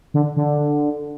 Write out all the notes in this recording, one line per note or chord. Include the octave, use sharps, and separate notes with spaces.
D3
D3